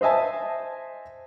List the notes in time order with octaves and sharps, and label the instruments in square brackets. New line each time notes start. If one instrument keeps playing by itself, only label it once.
[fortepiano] C5 D#5 E5 G#5 A5